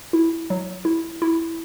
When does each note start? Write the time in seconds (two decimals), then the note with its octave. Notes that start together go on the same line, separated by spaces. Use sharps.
0.13 E4
0.50 F#3
0.85 E4
1.22 E4